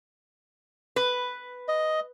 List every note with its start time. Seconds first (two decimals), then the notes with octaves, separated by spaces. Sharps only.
0.96 B4
1.68 D#5